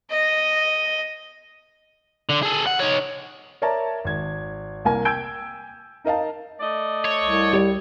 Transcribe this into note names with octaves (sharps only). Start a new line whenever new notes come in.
D#5
D3
G#4 A4
F#5
D#4 C#5
A#4 C#5 D5 E5 A5 A#5
G#1 G#6
C2 A#3 A#4 G#5 A#5
G5 G#5 E6 G6 G#6 D7
D#4 A#4 D#5 F5 A5
A3 D5 D#5
C#5
C2
G3